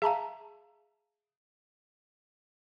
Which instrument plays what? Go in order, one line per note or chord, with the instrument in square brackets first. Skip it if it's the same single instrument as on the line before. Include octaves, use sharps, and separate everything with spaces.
[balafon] G#4 F5 [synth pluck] E5 A5 A#5